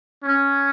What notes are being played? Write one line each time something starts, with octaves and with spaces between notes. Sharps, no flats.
C#4